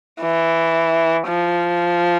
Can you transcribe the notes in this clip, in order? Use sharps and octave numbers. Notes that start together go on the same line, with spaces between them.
E3
F3